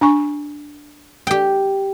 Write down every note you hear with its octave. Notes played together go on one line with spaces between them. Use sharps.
D4 G#5 C#6
G4 G5